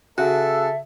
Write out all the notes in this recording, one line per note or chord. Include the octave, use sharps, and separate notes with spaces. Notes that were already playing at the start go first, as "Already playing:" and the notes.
C#3 F#4 A4 E5